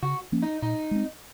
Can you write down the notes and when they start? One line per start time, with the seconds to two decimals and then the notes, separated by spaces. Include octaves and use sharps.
0.02 C#3 F#4
0.32 F3 A#3 C#4
0.42 D#4
0.62 A#2 D#4
0.91 G#3 C4